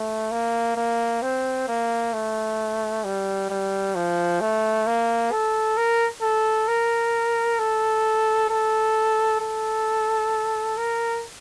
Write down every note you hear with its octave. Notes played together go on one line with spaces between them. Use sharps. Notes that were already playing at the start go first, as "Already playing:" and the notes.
Already playing: A3
A#3
A#3
C4
A#3
A3
G3
G3
F3
A3
A#3
A4
A#4
A4
A#4
A4
A4
A4
A#4